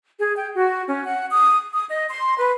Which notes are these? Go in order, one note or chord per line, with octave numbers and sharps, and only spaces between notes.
G#4
G5
F#4
C#4
F#5
D#6
D#6
D#5
C6
B4